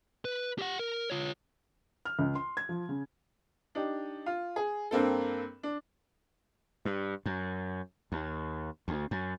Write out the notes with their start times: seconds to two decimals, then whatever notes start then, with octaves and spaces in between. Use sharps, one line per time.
0.25 B4
0.59 G4 F#5
0.79 A#4
1.10 F4 C#5
2.05 F6
2.19 C#2
2.35 C6
2.57 G#6
2.69 F3
2.89 C#3
3.75 D4 D#4 G4
4.26 F4
4.56 G#4
4.91 G2 A#3 C4 A4
5.63 D4
6.85 G2
7.26 F#2
8.12 D#2
8.88 D2
9.11 F#2